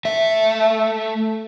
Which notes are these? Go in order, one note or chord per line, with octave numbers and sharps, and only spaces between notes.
A3 E5